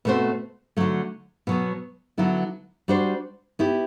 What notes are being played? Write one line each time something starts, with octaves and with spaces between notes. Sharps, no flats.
B2 A3 C4 F#4 C5
D3 F#3 A3
B2 F#3 B3
D3 F#3 B3 E4
G3 D4 F#4 C5
B3 E4 G4